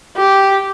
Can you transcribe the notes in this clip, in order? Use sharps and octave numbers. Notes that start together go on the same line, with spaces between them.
G4